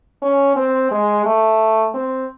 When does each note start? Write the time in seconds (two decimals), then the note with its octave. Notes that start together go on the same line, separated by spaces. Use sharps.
0.22 C#4
0.56 C4
0.91 G#3
1.25 A3
1.94 C4